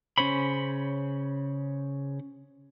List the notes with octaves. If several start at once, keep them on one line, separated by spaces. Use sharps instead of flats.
C#3 C#4 C5 C#5 B5